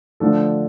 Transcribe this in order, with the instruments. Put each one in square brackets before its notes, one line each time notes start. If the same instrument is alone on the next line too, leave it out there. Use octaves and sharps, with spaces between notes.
[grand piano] D3 F3 A3 D4 A4